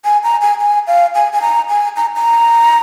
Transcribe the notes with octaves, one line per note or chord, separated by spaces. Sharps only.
G#5
A#5
G#5
G#5
F5
G#5
G#5
A#5
G#5
A#5
A#5